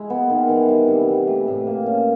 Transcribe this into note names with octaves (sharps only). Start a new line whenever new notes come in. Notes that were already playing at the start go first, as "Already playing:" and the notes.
Already playing: G#3 E4
B3
D#3
E3
G3
C3
E3
A3
A2
A#3
C#4